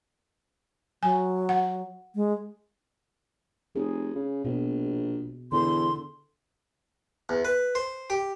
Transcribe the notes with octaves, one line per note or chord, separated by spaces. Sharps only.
F#3 G#5
F#5
G#3
F1 G#4
C#3
A#1 B2
E2 D3 A4 C6
E2
B4
C5
G4